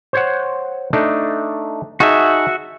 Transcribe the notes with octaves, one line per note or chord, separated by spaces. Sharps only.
C5 C#5 F#5
A3 D4 D#4
D#4 F#4 G#4 E5 A5